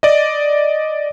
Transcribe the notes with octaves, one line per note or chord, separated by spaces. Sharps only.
D5 D#5